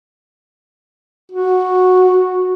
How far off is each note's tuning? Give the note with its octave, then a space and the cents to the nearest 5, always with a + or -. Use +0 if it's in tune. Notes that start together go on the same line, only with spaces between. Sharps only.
F#4 -10